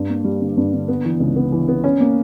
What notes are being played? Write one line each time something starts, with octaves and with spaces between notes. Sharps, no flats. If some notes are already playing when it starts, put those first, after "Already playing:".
Already playing: G2
A#3
G3
D3
G2
D3
B3
E3
C#2
B3
E3
B3
C#4
A#3